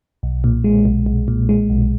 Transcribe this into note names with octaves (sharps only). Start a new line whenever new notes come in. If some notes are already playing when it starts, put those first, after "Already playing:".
B1
A#2
G#3
B1
B1
A#2
G#3
B1